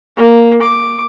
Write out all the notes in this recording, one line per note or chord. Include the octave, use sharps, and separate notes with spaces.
A#3
D6